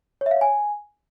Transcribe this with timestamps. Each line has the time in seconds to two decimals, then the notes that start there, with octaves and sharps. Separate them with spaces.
0.21 C#5
0.26 E5
0.31 F5
0.36 C#5
0.41 G#5